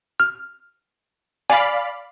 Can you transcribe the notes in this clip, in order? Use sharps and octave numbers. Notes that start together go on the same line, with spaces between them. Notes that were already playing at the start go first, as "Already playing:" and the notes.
F6
D5 F5 G#5 B5